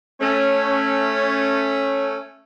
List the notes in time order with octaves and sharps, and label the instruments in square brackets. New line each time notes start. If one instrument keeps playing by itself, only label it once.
[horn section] A3 C#4